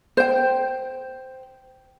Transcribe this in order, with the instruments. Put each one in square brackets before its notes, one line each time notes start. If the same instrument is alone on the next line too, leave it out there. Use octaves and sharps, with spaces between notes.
[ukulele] C5 G5